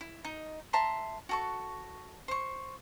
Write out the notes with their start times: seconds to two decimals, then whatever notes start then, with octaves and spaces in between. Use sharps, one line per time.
0.01 E4
0.25 D#4
0.73 E5 A5 A#5 C6
1.29 F#4 A4 C#6
2.28 C5 C#6